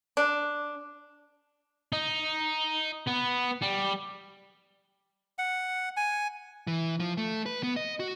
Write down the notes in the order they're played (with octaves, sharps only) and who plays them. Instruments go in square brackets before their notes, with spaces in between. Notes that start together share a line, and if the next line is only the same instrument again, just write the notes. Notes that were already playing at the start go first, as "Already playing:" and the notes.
[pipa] D4
[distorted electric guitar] D#4
B3
G3
[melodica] F#5
G#5
[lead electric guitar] E3
F3
A3
B4
B3
D#5
F#4